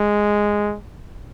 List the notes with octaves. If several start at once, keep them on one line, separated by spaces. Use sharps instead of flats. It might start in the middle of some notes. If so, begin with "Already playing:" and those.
Already playing: G#3